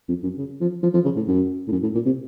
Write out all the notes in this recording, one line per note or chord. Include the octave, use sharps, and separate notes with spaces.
F2
F#2
C#3
F3
F3
F3
C#3
A2
F#2
A2
F#2
A2
A#2
C3